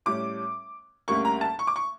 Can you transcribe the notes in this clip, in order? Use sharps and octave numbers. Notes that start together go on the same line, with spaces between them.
A2 G3 C#4 D6
D2 C#3 G3 A#3 C#6
A#5
A5
C#6
D6
C#6